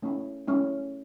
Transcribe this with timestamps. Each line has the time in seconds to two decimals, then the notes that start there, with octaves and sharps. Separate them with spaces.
0.02 A3 C#4 E4
0.48 A3 C#4 E4